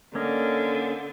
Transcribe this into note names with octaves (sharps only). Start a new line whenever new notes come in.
D3 A#3 C#4 D#5